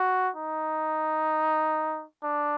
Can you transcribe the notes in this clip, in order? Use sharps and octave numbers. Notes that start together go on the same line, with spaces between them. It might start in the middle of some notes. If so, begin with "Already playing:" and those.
Already playing: F#4
D#4
D4